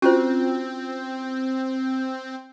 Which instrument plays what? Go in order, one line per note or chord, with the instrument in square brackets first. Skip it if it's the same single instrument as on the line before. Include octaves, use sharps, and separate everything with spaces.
[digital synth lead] C4 [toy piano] C#4 F4 C5 [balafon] F#4